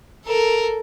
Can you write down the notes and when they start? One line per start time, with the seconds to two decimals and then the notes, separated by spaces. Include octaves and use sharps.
0.24 A4 A#4